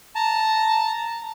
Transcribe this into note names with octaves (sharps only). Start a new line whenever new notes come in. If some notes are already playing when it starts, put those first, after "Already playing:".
A5 A#5